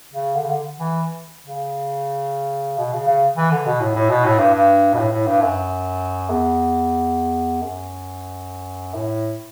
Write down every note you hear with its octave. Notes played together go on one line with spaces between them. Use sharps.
C#3
D3
C#3
D3
E3
C#3
B2
C#3
C#3
E3
D3
B2
A2
A2
B2
A2
G2
G2
B2
A2
A2
G2
F#2
E2
F#2
A2